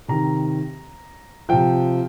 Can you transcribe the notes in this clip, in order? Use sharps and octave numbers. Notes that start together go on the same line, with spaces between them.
C3 D#3 A#5
C3 F3 G5